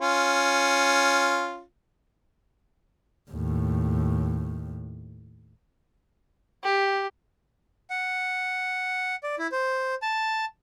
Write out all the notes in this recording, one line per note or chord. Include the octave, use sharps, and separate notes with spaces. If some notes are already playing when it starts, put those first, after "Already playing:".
C#4 F4
D#2 A2
G4
F#5
D5
E4
C5
A5